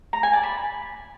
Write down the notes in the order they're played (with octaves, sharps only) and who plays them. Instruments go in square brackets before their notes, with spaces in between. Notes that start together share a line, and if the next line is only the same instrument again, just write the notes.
[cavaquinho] A#5
G#5
D5
B5